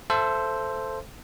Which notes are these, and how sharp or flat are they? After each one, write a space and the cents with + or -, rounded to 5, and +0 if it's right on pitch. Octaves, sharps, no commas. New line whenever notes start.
A4 +0 C5 +0 E5 +35